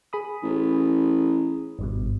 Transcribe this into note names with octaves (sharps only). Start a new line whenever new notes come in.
G#4 B5 D#6
A1
G#1 G2 B2